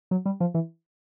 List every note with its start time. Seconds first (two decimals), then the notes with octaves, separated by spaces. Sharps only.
0.11 F#3
0.26 G3
0.40 F3
0.54 E3